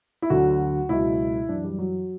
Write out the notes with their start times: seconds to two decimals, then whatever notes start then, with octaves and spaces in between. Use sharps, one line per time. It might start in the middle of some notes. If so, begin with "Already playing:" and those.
0.22 E4
0.30 D2 D3 F#3 F#4
0.89 C#2 B2 F#3 E4
1.49 F#2 E3 D4
1.64 G3
1.79 F#3